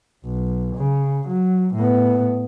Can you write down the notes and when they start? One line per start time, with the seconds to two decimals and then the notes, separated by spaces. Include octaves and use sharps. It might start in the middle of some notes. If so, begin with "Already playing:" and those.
0.24 B1
0.76 C#3
1.28 F#3
1.75 A2 B3